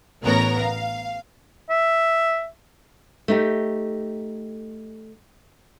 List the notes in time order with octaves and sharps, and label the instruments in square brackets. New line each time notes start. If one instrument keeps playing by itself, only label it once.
[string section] A1 B3 A#4 C#5 A#5
F5
[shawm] E5
[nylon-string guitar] A3 D#4 G4